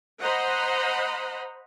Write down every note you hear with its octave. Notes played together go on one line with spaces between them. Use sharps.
C5 D#5 F#5 A#5 B5